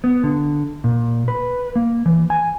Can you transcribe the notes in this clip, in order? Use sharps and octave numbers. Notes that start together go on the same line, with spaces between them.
B3
D3
A#2
B4
A#3
E3
G#5